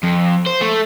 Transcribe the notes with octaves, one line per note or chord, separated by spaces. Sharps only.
F2
C5
A3